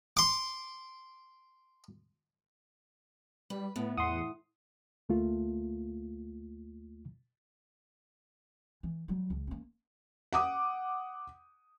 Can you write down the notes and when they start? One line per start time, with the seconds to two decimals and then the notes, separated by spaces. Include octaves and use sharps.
0.17 C6 D6
3.50 G3 B4
3.76 A2 B3
3.97 E2 F#5 C6 D#6
5.09 D2 A3 A#3 F4
8.83 E3
9.08 F#3 G3
9.30 C#2
9.47 A#3 C#4
10.33 F#5 D6 D#6